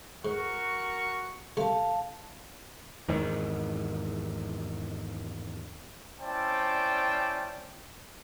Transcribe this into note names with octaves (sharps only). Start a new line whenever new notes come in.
G#2 F#4 A#4 C#6
C2 A3 F5 A5
E2 G#2 D#3
C#4 E4 C5 D5 G5 A5